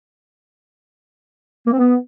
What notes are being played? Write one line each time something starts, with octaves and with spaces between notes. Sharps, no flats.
A#3
C4
B3